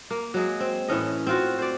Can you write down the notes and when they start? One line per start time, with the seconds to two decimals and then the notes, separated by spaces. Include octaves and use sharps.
0.10 A#3
0.34 F#3 G#3 G#4
0.60 C4
0.88 A2 E3 C#4 D#5
1.27 C4 F4 F#4
1.59 C5 D5